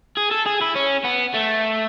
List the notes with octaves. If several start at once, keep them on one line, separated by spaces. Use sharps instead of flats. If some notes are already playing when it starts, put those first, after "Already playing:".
G#4
A4
G#4
E4
C#4
B3
A3